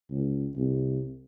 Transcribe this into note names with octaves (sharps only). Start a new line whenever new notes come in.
C#2
C2